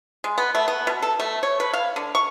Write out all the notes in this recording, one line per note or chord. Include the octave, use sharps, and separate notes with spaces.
G#3
B3
A3
B3
B2
A4
A3
C#5
B4
F5
D3
C#6